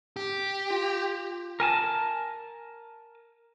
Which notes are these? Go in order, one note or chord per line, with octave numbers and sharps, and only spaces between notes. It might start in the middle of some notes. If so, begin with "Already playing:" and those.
G4
F4
A#4 G#5 A5